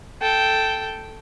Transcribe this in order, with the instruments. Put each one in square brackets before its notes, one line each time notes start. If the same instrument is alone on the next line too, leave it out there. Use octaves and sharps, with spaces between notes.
[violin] A4 G5